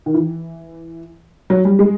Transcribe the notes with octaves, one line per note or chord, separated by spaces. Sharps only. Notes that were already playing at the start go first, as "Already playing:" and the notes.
D#3
E3
F#3
G3
G#3